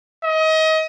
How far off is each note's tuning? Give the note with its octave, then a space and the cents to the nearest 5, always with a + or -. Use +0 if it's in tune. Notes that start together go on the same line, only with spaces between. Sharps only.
D#5 +30